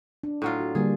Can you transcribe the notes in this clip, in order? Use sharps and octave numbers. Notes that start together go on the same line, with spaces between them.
D4
A2 F#3 F4
F#4
D3 G3 A#3 G#4